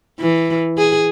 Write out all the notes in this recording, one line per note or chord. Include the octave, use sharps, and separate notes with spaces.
E3
G#4